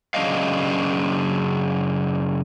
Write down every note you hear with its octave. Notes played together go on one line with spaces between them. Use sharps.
F#2 C#3 A3 D4 D#5 F5